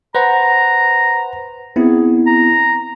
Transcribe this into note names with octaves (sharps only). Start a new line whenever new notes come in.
B4 C5 F#5 A#5
B3 C4 E4 G#4
A#5